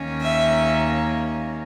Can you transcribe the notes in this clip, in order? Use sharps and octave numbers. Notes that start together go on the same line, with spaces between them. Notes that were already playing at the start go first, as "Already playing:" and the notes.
Already playing: D#2 D#3 A#3 C#4
E5